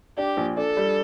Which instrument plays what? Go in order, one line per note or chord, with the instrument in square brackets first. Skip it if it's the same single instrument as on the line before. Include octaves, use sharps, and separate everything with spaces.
[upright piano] D4 [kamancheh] G4
[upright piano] A#1
[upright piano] D4 [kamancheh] A4
[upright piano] G3